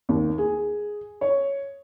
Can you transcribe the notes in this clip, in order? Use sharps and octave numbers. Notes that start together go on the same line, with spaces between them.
D#2
G#4
C#5